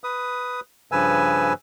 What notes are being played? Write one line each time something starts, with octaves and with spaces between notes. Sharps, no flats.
B4 D#6
G2 C#3 F3 B4 G#5 E6